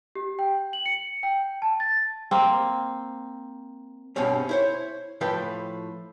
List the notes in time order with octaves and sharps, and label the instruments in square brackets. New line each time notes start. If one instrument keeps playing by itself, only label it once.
[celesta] G4
G5
F#7
C#7
G5
A5
A6
[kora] A#3 C4
[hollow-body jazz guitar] G2 B2 G#3 C4 C#4
E4 C5 C#5
A2 F3 B4 G5